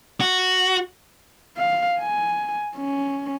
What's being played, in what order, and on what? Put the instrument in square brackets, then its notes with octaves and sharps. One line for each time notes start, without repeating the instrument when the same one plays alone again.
[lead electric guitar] F#4
[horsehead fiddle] F5
G#5
C#4